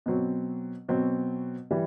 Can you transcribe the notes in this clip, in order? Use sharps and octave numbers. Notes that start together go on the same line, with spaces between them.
B2 F#3 C4
B2 F#3 C4
E3 G3